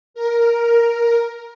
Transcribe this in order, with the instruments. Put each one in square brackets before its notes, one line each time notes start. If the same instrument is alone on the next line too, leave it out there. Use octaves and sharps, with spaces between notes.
[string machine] A#4